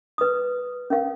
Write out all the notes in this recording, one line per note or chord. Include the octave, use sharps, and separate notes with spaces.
B4 D#6
C#4 A#4 F5